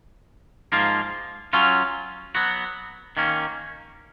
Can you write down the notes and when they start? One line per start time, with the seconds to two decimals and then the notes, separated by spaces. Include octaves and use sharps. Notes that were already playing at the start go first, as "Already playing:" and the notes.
0.72 G#2 F3 A#3 F4
1.53 F#3 C#4 F4
2.35 F#3 B3 F#4
3.17 D#3 A#3 C#4